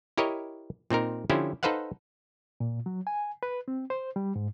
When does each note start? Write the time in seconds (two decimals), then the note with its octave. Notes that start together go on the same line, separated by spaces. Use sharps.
0.18 E4 G4 A#4 C#5 D#5
0.90 A#2 C4 D#4 A#4
1.30 D3 F3 C#4 E4 G4 C5
1.63 D#4 A4 B4 C5 F5 F#5
2.60 A#2
2.86 F#3
3.07 G#5
3.43 B4
3.68 C4
3.90 C5
4.16 G3
4.36 G#2